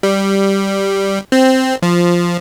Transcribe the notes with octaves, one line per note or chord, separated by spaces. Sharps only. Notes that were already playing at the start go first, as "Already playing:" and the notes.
G3
C4
F3